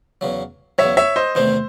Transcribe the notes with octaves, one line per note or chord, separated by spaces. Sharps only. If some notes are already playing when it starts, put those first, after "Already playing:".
E2 C#3 F#3
E2 C#3 F#3 C#5 E5
C#5 E5
C5 D#5
E2 C3 D#3 A3 C4 C5